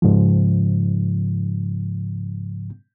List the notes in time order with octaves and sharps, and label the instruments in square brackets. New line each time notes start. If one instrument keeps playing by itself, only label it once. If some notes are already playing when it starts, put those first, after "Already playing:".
[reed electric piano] G#2 C#3 F3